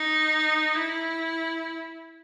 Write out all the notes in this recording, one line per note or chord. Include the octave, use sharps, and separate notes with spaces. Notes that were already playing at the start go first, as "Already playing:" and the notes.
Already playing: D#4
E4